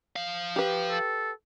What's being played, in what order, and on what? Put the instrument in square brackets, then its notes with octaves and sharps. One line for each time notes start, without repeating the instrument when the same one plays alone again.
[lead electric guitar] F3 F5
[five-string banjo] G4 B4
[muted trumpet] A4